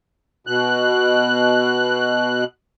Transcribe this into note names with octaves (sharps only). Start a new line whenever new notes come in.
B2 F#6